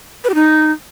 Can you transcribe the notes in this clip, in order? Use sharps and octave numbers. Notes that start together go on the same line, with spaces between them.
B4
G4
D#4